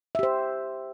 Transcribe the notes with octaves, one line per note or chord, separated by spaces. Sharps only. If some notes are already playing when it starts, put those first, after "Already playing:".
G4 C5 E5